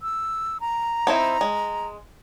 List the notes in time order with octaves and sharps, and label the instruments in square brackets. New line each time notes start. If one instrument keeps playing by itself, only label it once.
[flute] E6
A#5
[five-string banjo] C4 D#4 E4
G#3